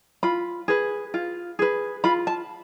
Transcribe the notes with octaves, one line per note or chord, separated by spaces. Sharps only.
F4 B5
G#4 B4
F4
G#4 B4
F4 B5
A5